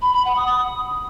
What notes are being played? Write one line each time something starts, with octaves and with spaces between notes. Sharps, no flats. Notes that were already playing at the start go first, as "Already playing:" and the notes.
B5
B5
F#5
D#6